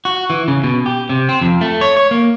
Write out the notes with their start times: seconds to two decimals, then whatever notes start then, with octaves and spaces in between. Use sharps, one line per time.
0.05 F#4
0.30 E3
0.48 C#3
0.64 B2
0.86 G4
1.10 C3
1.29 C4
1.41 F2
1.61 A3
1.81 C#5
1.97 C#5
2.11 A#3